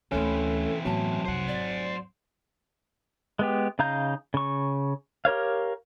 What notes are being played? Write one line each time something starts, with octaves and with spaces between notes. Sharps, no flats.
D2 E3 A3 C4 C#4 A4
A2 F#3 B3 A5
C2 F2 C5 F#5
G#1 D5
G#3 B3 G4
C#3 D#4 F5 A#5 G6
C#3 C#6
G4 A#4 C#5 F5